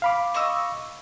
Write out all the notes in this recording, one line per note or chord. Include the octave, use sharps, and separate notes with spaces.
F5 B5 D6
D#5 C#6 E6